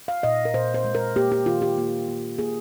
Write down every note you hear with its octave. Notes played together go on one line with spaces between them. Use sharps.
F5
A#2 D#5
A#4
A#2 C5
C5
G#3
A#4
A#3 G4
G4
D#3 F4
G4
A#3
A#3
A#3 G#4